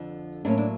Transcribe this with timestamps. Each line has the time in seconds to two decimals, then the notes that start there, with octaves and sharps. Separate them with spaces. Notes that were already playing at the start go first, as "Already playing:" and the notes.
Already playing: F2 D3 F3
0.45 A2 F#3 A#3 C#4 D4
0.58 D4